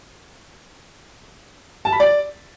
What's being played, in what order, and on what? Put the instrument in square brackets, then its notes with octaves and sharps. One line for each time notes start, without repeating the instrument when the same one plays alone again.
[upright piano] A5
B5
D5